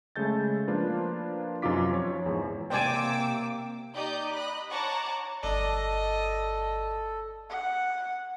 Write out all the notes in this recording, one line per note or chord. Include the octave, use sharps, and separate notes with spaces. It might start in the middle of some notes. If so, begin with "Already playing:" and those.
C#3 G#3 A3 A4 G6 A6
F3 A#3 D4 F4 B4
F#2 C3 D#4 F4 D6 B6
F3 C#5
E2 G#2
C3 A#3 C5 D5 G5 G#5 D6 E6
D#4 G4 D5 D#5 G6
D#5 B5 F#6
C#5 F#5 A5 A#5 C#6 D6
G1 D4 A4 D#5
F#5